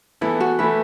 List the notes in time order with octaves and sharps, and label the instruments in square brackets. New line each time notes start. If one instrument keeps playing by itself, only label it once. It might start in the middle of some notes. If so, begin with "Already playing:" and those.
[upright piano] E3 B3 A4 [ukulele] E4
[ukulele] F#4
[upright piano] E3 A3 E4 A4 [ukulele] B4